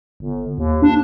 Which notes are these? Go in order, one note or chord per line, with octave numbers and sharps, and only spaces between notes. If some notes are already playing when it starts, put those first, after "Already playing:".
G1
D#2
D4